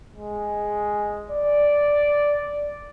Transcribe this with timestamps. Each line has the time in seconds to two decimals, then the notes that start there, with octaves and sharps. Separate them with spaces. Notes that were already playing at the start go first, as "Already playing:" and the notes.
0.16 G#3
1.30 D5